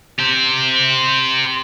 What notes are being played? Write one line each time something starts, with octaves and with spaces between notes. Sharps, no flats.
G4 C5